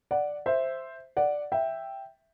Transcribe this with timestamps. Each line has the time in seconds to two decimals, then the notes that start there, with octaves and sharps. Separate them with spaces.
0.11 D5 F#5
0.46 C5 E5
1.17 D5 F#5
1.52 E5 G5